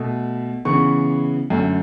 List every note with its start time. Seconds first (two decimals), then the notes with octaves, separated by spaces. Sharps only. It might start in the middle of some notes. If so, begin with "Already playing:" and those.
Already playing: B2 A3
0.65 C#3 E3 B3 C#6
1.50 F#2 D3 A3